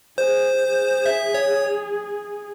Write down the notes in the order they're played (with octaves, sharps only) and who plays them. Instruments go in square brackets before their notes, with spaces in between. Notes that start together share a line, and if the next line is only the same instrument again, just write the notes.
[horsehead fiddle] G#4 [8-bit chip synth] C5
[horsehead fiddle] G#4
[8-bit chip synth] E5
C#5